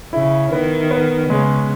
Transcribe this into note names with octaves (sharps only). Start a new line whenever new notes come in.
C#3 E4
D#3 B3
B3
C#3 G#3